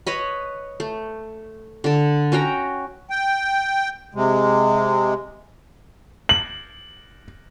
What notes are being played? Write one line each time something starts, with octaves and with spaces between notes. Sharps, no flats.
B4 C#5 D#5 B5
A3
D3 A4
C#4 F#4 G5 A#5
G5
C3 G#3
F#7